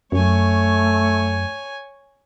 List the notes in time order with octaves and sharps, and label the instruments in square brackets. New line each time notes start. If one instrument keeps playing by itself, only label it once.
[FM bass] F#2 [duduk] A3 [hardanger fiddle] C#5 G#5